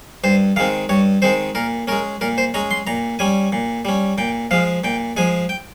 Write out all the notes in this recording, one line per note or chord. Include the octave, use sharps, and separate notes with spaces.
G2 C5
D#3 G#3 C4 F5
G2 C#5
D#3 G#3 C4 C5
A#2 A#4
G#3 C#4 A#4
A#2 A#4
C5
G#3 C#4 A#5
C6
A#2 A#5
G3 C#4 G#5
A#2
G3 C#4
A#2 G5
F3 G#3 F5
A#2 G5
F3 G#3 G#5
G5